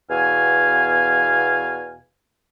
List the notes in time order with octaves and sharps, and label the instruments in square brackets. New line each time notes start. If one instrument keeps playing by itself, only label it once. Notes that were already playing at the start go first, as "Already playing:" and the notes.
[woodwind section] E2 B2 F5 G#5